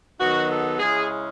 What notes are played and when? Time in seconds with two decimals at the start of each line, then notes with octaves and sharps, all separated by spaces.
0.19 D#3 F#3 B3 D#4 F#4
0.50 A4
0.80 C#3 G#3 C#4 E4 G#4